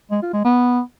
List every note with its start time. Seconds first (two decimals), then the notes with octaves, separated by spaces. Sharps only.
0.11 G#3
0.22 F4
0.34 G#3
0.45 B3